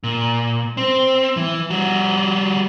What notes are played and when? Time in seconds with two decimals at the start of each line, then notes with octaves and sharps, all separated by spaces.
0.04 A#2
0.77 C4
1.37 E3
1.70 G3 F#4